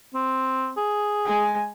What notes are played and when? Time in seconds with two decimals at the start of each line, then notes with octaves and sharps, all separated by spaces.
0.15 C4
0.77 G#4
1.25 G#3 G#5